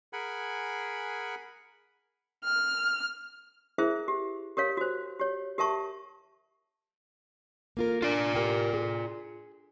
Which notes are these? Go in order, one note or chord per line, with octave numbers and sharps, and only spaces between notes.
G#4 A#4 F#5 G#5 B5
F6
E4 G#4 A#4 C5 E5
G4
G4 A#4 C#5 F5
F#4 C5
G4 C#5
G4 A#4 E5 A5 C#6
A#3 F4 A#4
D4 F4 D5
G4 A#4 G5
G#4